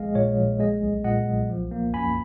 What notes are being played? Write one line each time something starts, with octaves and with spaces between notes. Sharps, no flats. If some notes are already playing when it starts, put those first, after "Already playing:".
Already playing: A#1 G#3 D#5 F5
A#2 C#5
A#1
G#3 D#5
B1
A#2 D#5 F#5
B1
F3
A#3
F#2 G#5 B5